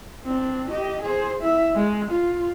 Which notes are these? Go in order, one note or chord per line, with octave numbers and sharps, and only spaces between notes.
C4 D4
G4 D#5
G#4 C5
E4 E5
G#3
F4